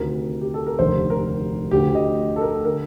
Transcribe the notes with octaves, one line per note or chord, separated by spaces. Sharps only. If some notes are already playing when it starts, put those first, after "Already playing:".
Already playing: D2 C3 D#3 A#4
G4
A4
A#4
F1 D#2 D3 C5
A#4
D2 D3 G4
D#5
A4
A#4
D3 A#4